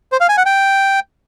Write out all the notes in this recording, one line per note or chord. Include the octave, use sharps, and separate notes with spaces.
C5
F5
G#5
F#5
G5